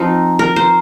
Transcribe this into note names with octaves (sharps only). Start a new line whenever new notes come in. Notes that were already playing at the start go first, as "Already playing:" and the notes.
Already playing: F3 C4 D#4
A#4
C5